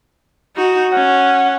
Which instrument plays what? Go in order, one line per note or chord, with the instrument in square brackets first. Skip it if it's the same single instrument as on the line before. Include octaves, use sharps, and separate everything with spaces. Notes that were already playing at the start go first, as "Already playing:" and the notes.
[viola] D#4 F#4
[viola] C#4 [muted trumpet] F#5